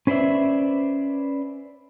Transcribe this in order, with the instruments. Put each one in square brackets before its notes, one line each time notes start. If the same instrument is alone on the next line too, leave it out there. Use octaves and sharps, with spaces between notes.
[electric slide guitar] C#4 B4 C5 D5 E5